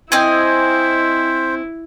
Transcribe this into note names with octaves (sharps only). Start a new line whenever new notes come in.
C4 E4 C5 D#5 G#5